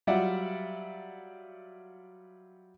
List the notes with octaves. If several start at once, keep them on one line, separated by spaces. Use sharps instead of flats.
F#3 G3 F4 D5 E5 F#5